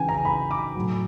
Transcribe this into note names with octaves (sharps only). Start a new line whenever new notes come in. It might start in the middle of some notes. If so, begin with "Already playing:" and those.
Already playing: C#3 E3 G5 G#5
A#5
B5
D6
A2 F#3